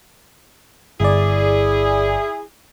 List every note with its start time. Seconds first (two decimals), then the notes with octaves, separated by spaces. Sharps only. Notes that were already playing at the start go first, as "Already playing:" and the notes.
1.00 G1 E4 G#4 D5